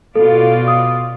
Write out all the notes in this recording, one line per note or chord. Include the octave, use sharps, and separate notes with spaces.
B2 F4 A4 D5
D#6